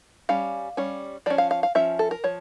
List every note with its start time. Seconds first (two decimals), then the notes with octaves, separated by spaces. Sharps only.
0.29 G3 C#4 F5
0.77 G3 C#4
1.26 F3 D5
1.30 C#4
1.38 F5
1.51 F5
1.63 F5
1.75 F3 C#4 E5
1.99 A4
2.11 A#4
2.24 F3 C#5